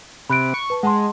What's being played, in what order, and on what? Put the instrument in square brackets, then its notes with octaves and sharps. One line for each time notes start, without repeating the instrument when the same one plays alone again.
[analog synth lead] C3 [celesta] B5 F#6 D7
[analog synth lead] C#6
[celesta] B4 A5
[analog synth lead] G#3 [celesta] F#5 A5 C6